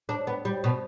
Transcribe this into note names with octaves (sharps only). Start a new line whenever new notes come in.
D4
B3
G3
B2